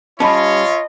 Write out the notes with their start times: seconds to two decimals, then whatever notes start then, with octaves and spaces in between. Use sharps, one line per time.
0.20 G3 C#4 F4 C#5 D#5 A5 B5